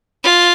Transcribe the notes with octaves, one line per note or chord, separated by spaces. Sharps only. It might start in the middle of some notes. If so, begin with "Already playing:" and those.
F4